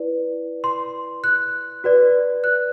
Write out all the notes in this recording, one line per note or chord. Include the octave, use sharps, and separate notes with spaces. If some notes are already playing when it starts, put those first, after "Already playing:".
Already playing: E4 B4 D5
C6
F#6
F#4 B4 D5
F#6